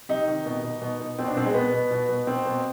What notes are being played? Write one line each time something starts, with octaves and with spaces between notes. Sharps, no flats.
C3 D#4
D#3
B2
B2
B2
B2
B2 C4
D4
B2 C4
G#3
B2 B3
B2
B2
B2
B2 C4
B2